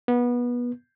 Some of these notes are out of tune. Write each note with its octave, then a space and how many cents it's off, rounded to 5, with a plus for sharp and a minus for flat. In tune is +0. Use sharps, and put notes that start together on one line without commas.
B3 -25